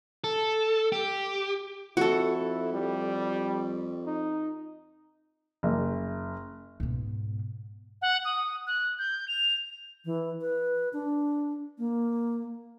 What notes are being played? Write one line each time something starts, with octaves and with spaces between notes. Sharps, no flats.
A4
G4
F2 E4 F#4 A4
G3
D#4
F#1
G#2 B2
F#5
D#6
F#6
G6
F7
E3
B4
D4
A#3